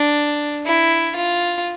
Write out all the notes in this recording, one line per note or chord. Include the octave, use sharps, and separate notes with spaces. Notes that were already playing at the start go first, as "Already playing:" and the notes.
Already playing: D4
E4
F4